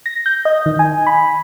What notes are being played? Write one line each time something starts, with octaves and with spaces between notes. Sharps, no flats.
A#6
G6
D#5
D#3
G#5
B5